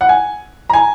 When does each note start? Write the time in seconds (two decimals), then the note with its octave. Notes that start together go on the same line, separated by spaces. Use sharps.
0.01 F#5
0.09 G#5
0.70 A#5
0.73 G#5